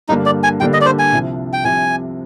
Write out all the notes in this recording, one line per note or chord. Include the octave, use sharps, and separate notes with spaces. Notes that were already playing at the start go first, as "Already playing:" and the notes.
G2 D3 G3 A#3 D4 D#4
D5
G#5
G2 D3 G3 A#3 D4 G5
D#5
D5
C5
G#5
C2 C3 F3
G5
C2 C3 F3 G#5